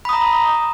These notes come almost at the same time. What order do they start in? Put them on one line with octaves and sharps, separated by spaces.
B5 D#6 A#5